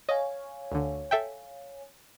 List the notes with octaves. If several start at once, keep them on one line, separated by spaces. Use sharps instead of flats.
C#5 D#5 F5 G#5
D2 D3
A4 E5 G5